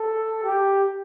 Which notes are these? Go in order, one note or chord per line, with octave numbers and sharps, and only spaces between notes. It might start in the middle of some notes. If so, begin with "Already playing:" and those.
Already playing: A4
G4